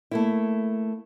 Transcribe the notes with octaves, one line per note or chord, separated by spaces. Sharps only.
A3 A#3 E4